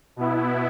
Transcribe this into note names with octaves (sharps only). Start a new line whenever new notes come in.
B2 B3 E4